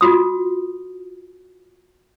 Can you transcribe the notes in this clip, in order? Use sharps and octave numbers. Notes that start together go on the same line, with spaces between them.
F4 F#4 D#6